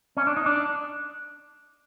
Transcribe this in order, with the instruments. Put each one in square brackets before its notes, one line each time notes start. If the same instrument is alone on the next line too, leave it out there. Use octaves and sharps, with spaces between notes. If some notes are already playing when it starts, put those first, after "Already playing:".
[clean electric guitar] C#4
D4
D#4
D4